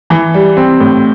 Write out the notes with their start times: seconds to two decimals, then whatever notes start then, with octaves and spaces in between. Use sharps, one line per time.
0.10 E3
0.34 G3
0.57 C4
0.80 A2